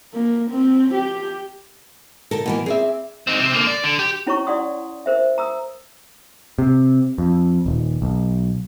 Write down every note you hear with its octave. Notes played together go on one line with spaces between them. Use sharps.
A#3
C4
G4
D#2 D3 A4 A#4
B2 E3 A#3 B3
C4 G#4 D5 E5
C4 D#4
C3 C4
D3 A#3
D5
D3
G4
C#4 E4 C#5 A#5 C#6
E4 D5 F#5 C6 D#6
A#4 C5 E5
A#5 D#6 E6
C3
F2
D#1
B1